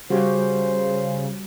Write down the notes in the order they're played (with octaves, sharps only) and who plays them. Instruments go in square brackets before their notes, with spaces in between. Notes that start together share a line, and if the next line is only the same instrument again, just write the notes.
[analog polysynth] C#3 [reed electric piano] G3 [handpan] F#4 G4 [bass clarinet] C5